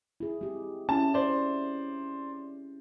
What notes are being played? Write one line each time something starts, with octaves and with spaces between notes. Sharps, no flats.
E4 G#4
G#3 C4 G4
C#4 E4 A5
C5 D5